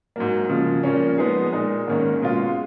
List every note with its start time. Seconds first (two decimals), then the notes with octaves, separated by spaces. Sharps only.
0.16 G#2 F#3 A#3
0.49 C#3 F3 A#3
0.83 A#2 F3 A#3 C#4
1.18 F3 G#3 B3 D#4 G#4
1.52 A#2 G#3 D#4
1.87 G#2 D#3 A#3 C#4
2.22 B2 G#3 C#4 F4